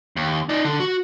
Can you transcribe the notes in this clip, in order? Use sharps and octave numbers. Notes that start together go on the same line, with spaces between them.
D#2
D#4 D5
D3
F#4